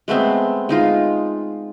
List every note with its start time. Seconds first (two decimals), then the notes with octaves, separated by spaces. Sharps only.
0.08 G#3 A3 B3 C4
0.69 G#3 D#4 F4